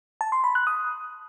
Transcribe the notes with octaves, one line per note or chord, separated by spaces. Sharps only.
A5
C6
B5
F#6
D#6